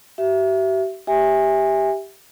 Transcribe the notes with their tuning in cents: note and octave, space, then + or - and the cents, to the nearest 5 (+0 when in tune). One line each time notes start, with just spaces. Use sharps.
G4 -45 E5 +15
G4 +0 E5 -15 G#5 -25